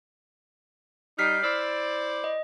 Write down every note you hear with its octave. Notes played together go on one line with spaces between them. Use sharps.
G3 D#4 F6 B6 C7
E4 C5 D5 E6
D#5